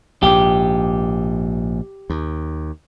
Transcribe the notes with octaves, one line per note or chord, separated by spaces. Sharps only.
A#1 G#2 G4
D#2